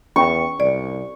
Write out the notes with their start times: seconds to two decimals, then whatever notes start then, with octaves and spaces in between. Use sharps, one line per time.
0.16 E2 C#4 G5 B5 C#6
0.60 C2 D5